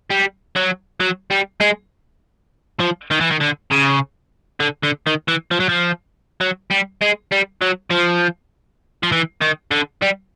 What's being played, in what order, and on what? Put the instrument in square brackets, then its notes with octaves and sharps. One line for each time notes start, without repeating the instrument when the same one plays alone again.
[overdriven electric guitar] G3
F#3
F#3
G3
G#3
F3
D#3
E3
D#3
D3
C#3
D3
D3
D#3
E3
F3
F#3
F3
F#3
G3
G#3
G3
F#3
F3
F3
E3
D#3
D3
G3